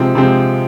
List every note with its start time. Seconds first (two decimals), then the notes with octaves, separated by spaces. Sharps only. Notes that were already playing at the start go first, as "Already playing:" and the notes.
Already playing: C3 F3 G#3 C4
0.15 C3 F3 G#3 C4